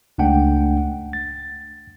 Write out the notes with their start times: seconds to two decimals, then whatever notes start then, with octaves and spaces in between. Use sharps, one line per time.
0.18 C#2 A3 D4 F#5 G5
1.13 A6